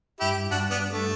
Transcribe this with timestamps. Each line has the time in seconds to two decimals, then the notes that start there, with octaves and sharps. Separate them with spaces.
0.20 G2 E4 G4
0.51 G2 D4 F#4
0.71 B3 D4
0.91 A3